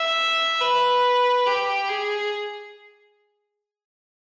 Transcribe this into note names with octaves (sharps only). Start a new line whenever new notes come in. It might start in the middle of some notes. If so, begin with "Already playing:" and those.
Already playing: E5
B4
G4
G#4